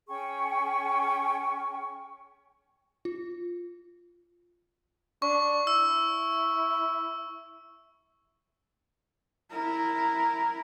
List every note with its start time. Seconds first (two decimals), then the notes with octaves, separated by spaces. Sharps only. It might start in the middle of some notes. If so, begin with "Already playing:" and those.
0.08 C#4 G#4 G5 C#6
3.05 F4
5.22 D4 C#6
5.67 E4 E6
9.52 E4 A#4